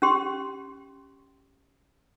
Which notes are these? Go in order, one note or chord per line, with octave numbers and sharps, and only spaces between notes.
C#4 G4 C6